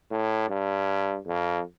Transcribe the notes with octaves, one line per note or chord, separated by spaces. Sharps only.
A2
G2
F2